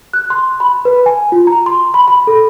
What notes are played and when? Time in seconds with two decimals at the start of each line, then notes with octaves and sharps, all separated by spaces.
0.13 F#6
0.30 C6
0.60 B5
0.85 B4
1.06 G#5
1.32 F4
1.47 A#5
1.66 C6
1.94 B5
2.08 B5
2.27 A4